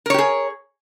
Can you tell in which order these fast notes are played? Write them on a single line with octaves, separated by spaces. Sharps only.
A#4 C#5 G4 G#4